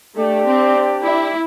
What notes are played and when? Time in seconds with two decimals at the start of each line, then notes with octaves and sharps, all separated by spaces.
0.15 A3 D4 G4 D5
0.45 C4
1.03 E4